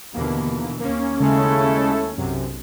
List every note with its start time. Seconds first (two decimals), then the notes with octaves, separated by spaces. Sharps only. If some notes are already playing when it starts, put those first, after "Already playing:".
0.14 D#2 B2 D3 E3 A#3
0.80 D#2 A#3 C#4
1.20 C#3 G#3 A3 E4 A4
2.17 B1 F#2 C3